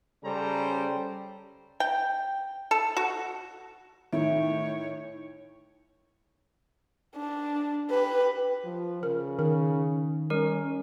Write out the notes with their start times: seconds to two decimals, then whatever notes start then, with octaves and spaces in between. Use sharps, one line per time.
0.24 C#3 G3 C#4 A4 C5 A#5
1.80 G5
2.71 A4
2.97 F#4
4.13 A2 D#3 D#4 C#5 E5 D7
7.17 D4
7.90 G4 B4
8.64 F3
9.03 C#3 A#4
9.39 D#3 A#4
10.30 G3 C#4 A#4